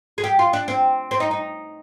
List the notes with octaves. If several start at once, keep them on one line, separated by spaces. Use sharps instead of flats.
G#4
G4
F4
D4
C4
C4
D#4
D#4